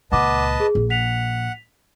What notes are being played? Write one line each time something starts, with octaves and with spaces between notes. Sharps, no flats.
C#2 A#2 B4 D#5 F#5 A5 D6
G#4
A#1
F#5 B6 F7